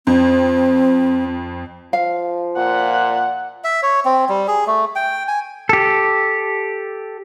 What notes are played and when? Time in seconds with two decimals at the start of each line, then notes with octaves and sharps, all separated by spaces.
0.07 F2 C4
1.93 F3 F5
2.57 A#2 F#5
3.64 E5
3.83 C#5
4.05 C4
4.29 G3
4.48 G#4
4.67 A3
4.96 G5
5.28 G#5
5.69 G4 A4